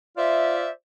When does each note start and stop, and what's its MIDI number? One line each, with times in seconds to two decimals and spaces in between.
0.18 0.68 65
0.18 0.68 72
0.18 0.68 74
0.18 0.68 76